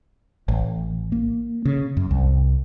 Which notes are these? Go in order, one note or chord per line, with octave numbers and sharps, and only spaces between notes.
A1
A#3
C#3
F#2
C2